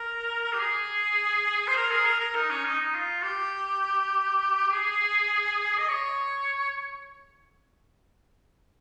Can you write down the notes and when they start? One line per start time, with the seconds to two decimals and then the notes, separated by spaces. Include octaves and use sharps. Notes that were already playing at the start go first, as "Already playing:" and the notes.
Already playing: A#4
0.53 G4
0.59 G#4
1.68 C5
1.76 A#4
1.91 G#4
2.06 A#4
2.20 A#4
2.35 D#4
2.50 C#4
2.65 D#4
2.80 D#4
2.94 F4
3.23 G4
4.71 G#4
5.78 D#5
5.89 C#5